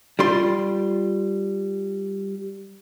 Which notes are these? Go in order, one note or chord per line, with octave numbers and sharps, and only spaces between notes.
G3 F4 C6